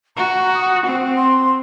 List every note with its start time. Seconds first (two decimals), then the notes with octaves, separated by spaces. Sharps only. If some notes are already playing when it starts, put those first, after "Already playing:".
0.17 F#4 A#5
0.54 D#6
0.86 C4 F#5
1.16 C6